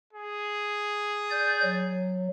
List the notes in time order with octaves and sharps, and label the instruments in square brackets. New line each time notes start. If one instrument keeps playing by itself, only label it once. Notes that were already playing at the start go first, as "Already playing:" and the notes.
[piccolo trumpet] G#4
[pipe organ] D5 G6
F#3